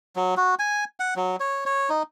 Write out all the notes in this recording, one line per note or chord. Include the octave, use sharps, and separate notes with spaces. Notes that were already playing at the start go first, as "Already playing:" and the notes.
F#3
F#4
G#5
F#5
F#3
C#5
C#5
D#4